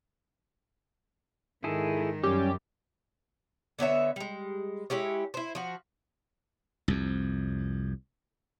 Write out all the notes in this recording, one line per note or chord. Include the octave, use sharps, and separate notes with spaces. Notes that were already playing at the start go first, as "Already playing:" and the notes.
G#2 D#3 E4 G#4 A4
F#2 G3 C#4 G4
D3 B3 C#5 E5
G3 G#3
G#3 E4 G4 C#5
E4 C5
F3 F#4
C2 F2